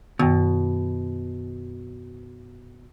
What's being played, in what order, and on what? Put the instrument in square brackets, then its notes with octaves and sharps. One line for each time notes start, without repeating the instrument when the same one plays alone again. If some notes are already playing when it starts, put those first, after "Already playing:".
[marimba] F#2 D#3 [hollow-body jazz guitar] B2